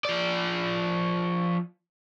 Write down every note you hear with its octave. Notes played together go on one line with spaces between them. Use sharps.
F3 D5